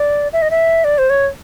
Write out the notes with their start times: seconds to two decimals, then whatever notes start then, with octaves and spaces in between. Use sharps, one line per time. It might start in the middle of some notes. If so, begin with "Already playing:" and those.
Already playing: D5
0.33 E5
0.42 D#5
0.51 E5
0.84 D5
0.98 C5
1.10 C#5